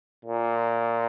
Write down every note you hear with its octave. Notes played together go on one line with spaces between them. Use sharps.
A#2